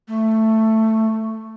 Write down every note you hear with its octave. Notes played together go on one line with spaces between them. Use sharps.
A3